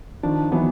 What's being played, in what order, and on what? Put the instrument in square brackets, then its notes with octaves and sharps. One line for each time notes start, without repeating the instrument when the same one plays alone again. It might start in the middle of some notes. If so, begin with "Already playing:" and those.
[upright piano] D#3 F3 [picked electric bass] D4
[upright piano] E3 F#3 [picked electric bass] B3